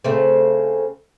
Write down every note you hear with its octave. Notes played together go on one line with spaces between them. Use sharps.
C#3 A3 C4